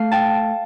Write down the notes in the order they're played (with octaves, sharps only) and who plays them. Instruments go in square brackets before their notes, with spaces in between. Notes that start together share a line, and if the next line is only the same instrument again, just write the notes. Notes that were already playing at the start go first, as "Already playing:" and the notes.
Already playing: [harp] A3 F5
G5 A5